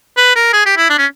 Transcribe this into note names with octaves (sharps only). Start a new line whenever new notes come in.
B4
A#4
G#4
G4
E4
D4
C#4